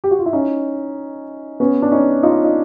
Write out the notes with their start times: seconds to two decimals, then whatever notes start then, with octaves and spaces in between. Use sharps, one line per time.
0.04 G4
0.11 F#4
0.19 F4
0.26 E4
0.33 C#4 D#4
1.60 B3 C#4
1.82 D4
1.92 C#4 D#4
2.23 D#4 F4
2.44 D#4 F4